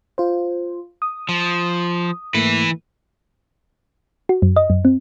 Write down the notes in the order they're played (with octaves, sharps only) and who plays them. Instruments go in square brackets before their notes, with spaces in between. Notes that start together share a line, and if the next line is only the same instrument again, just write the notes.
[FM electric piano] F4 C5
D#6
[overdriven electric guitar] F3
[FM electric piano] G#2 A3 A#3 [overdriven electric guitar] E3 B4
[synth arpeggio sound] F#4
F#2
D#5
F#2
C4